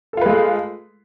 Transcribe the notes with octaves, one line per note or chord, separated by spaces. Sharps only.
G#3 A3 F4 A4 B4